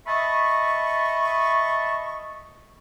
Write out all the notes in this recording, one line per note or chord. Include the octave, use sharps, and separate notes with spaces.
D#5 E5 A5 B5 C#6